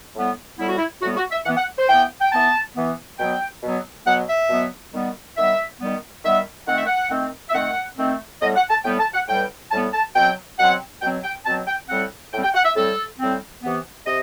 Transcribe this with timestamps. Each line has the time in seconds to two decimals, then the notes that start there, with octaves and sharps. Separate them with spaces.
0.15 A2 G3 B3
0.59 A2 G3 B3 E4
0.68 F#4
0.77 E4
1.02 A2 G3 B3 F#4
1.17 F#4
1.31 E5
1.46 E3 B3 F#5
1.57 F#5
1.79 C5
1.89 E3 B3 G5
2.21 G5
2.32 E3 B3 A5
2.76 E3 B3
3.19 B2 F#3 B3 G5
3.63 B2 F#3 B3
4.07 B2 F#3 B3 F#5
4.28 E5
4.50 B2 F#3 B3
4.94 D#3 G3 B3
5.37 D#3 G3 B3 E5
5.81 D#3 G3 B3
6.24 D#3 G3 B3 E5
6.68 D#3 A3 C4 F#5
6.77 E5
6.86 F#5
7.11 D#3 A3 C4
7.50 E5
7.54 D#3 A3 C4 F#5
7.98 D#3 A3 C4
8.41 A2 G3 B3 D#5
8.56 F#5
8.70 A5
8.85 A2 G3 B3 G5
8.99 A5
9.14 F#5
9.28 A2 G3 B3 G5
9.72 A2 G3 B3 A5
9.94 A5
10.16 B2 F#3 C4 G5
10.59 B2 F#3 C4 F#5
11.02 B2 F#3 C4 G5
11.24 G5
11.46 B2 F#3 C4 A5
11.67 G5
11.89 A2 G3 C4 F#5
12.32 A2 G3 C4 G5
12.43 G5
12.54 F#5
12.65 E5
12.76 A2 G3 C4 A4
13.19 A2 G3 C4
13.63 C3 E3 B3
14.06 C3 D#5